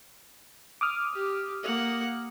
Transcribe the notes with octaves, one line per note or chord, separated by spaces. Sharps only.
D6 D#6 F6
G4
A#3 F#5